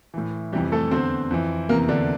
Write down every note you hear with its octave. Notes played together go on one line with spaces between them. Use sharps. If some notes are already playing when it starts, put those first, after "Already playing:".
A2 E3
F2 C3 E3 G3 G4
A3 A4
E2 D3 C4 C5
F2 E3
E2 C3 E3 A#3 A#4
D3 D4